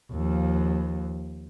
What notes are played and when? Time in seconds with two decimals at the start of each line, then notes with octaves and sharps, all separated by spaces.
0.12 D#2 F3